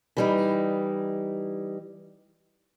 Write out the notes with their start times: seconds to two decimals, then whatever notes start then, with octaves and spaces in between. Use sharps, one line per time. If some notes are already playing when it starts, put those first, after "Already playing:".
0.17 E3 G3 D#4